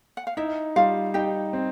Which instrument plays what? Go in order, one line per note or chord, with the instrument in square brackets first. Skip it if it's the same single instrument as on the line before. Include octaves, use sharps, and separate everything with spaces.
[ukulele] F#5
F5
[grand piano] D#4 [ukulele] E4 E5
[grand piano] G3 [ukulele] F4 F5
[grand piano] D#4 [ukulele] G4 G5
[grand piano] C4